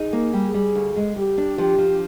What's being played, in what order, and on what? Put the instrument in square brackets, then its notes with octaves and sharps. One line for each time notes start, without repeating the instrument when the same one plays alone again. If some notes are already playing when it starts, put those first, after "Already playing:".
Already playing: [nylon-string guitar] D#4 [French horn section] G#4
[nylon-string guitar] A#3
G3
G3
D2
G#3
[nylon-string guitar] G3 [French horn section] G4
[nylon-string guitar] D4
[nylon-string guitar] F3 [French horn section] G4
[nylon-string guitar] F3